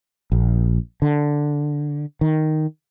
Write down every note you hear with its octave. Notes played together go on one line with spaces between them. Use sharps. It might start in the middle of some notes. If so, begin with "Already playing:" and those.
A#1
D3
D#3